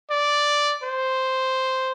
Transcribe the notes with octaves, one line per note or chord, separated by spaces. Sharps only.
D5
C5